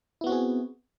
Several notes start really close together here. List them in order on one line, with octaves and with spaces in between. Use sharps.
E4 B3 F#4 C4 G#4